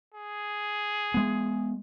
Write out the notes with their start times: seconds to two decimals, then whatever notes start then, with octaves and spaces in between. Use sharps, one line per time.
0.14 G#4
1.14 G#3 B3